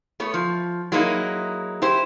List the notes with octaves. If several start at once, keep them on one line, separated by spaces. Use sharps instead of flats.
A3 B3 C#5
F3
F#3 G#3 A#3 D#4 E4
E4 G4 C5